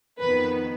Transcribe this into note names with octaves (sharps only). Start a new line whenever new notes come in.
F2 D#3 B3 B4